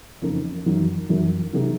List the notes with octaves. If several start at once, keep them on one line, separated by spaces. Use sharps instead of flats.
F2 C#3 F3 A#3 D#4
F#2 D#3 F#3
F#2 D#3 F#3
C3 F#3 A#3 D#4 G#4